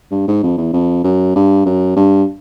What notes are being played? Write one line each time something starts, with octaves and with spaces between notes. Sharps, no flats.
G2
G#2
F2
E2
F2
F#2
G2
F#2
G2